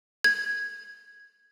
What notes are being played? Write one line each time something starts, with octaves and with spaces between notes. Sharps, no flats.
G#6